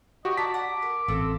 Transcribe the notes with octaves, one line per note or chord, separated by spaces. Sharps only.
F#4 G4 D#5 C#6
D5 A5 A#5 B6
F#5 D6
A#4
A1 C4 F4 A4